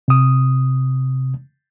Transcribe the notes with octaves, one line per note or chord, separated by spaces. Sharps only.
C3 D#6